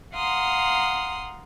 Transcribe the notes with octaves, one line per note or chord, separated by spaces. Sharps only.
F5 F#5 A#5 C6 D#6